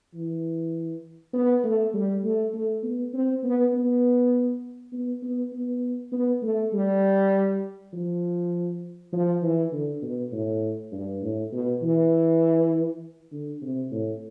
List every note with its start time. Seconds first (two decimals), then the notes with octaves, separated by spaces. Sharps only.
0.14 E3
1.33 B3
1.64 A3
1.94 G3
2.23 A3
2.54 A3
2.83 B3
3.13 C4
3.44 B3
3.73 B3
4.92 B3
5.23 B3
5.53 B3
6.12 B3
6.42 A3
6.73 G3
7.93 F3
9.13 F3
9.42 E3
9.72 D3
10.02 B2
10.32 A2
10.92 G2
11.22 A2
11.52 B2
11.82 E3
13.31 D3
13.62 C3
13.91 A2